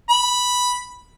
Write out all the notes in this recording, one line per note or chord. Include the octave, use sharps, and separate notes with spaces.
B5